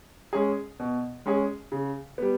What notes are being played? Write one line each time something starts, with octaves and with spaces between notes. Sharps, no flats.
G#3 C#4 G#4
B2
G#3 C#4 G#4
C#3
G3 B3